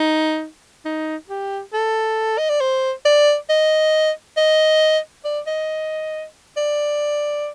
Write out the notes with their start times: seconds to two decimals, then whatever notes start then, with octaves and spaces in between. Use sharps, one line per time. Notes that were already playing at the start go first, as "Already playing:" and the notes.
Already playing: D#4
0.85 D#4
1.29 G4
1.73 A4
2.38 D#5
2.49 D5
2.61 C5
3.05 D5
3.49 D#5
4.37 D#5
5.25 D5
5.47 D#5
6.57 D5